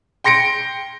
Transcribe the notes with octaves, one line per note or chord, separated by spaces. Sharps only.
G5 C6 A#6 C#7 D7